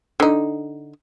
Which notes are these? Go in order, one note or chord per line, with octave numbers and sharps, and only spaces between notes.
D3 D#4